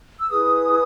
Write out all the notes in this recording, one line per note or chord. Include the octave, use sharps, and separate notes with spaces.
E6
E4 G#4 B4 D#6